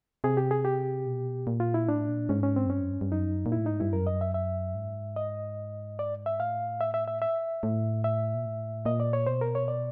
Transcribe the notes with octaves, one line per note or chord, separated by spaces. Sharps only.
C3 G#4
G4
G#4
G4
B2
A#2
F4
E4
A2 D4
A#2
G#2 C#4
C#4
C4
F#2
G2 C#4
F#2
G2
G2
F#2 D#4
A#2
E4
A2
G#2 D#4
G2 E4
F#2 A#4
D#5
E5
E5
G#2
D#5
D5
E5
A2 F5
E5
E5
E5
E5
A2
E5
A#2
A2
A#2 D#5
D5
C#5
B2 C5
A#4
C#5
D5